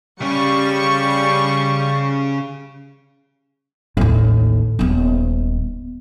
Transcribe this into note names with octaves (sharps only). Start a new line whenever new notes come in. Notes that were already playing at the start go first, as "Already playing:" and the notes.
C#3 G3 C#4 C#6
A1 D#2
D#1 B3